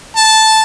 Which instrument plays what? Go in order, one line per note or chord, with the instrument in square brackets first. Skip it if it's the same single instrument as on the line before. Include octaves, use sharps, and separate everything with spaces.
[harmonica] A5